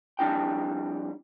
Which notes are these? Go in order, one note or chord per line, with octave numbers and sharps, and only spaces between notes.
F2 G3 D4 E4 G5